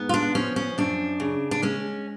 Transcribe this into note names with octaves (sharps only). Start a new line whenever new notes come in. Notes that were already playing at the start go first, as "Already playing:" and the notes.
Already playing: G#2 B3
F4
D4
F3 C#4
C#4
F#2 D4
C#3
D4
G#3 C#4